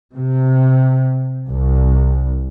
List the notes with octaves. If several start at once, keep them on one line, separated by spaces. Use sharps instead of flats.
C3
C2